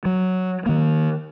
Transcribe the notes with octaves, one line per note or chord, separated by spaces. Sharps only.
F#3
D#3 A#3